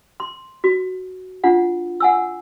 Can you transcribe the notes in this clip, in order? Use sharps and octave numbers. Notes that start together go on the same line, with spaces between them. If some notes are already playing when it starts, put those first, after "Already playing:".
C6
F#4
D4 F4 F#5
F#5 G#5 E6